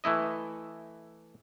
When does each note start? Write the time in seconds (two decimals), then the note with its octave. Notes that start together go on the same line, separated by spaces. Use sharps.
0.04 E3 A3 E4 D#5